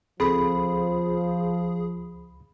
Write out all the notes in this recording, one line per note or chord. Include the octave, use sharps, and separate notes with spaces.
C#2 F3 C4 G#4 A4 B5